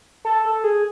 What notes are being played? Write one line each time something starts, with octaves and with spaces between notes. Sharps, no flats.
A4
A4
G#4